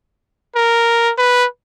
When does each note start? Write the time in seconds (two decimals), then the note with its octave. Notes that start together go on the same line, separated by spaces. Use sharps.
0.56 A#4
1.18 B4